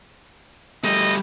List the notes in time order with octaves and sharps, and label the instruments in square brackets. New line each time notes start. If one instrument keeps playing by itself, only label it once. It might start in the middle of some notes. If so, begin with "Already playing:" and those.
[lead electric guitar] G3 A3 [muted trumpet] D#5